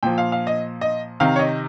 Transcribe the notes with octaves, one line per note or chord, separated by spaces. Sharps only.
A#2 F3 G5
F5
F5
D#5
D#5
C3 D#3 F5
C#5
D#5